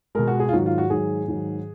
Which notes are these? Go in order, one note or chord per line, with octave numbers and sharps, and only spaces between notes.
B2 G#3 A#4
F#4
G#4
F4
G#2 D#3 F#3 F#4
F4
F#4
G#2 D#3 F#3 G#4
G#2 D#3 F#3